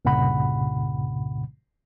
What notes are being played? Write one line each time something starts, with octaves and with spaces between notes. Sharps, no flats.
C2 G2 A#2 C#3 F#5 B5